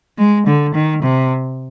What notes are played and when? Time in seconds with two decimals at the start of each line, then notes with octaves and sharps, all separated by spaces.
0.18 G#3
0.47 D3
0.74 D#3
1.02 C3